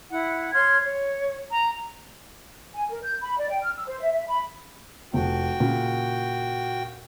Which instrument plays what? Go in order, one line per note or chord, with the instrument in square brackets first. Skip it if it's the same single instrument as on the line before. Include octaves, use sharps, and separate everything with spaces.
[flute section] E4 F#5
C#5 C6 F6 G#6
C#5
A#5
G#5
A#4
G6
B5
D5
G5
F6
E6
C5
E5
E5
B5
[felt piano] F1 [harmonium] F#4 G5
[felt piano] A#2 C#3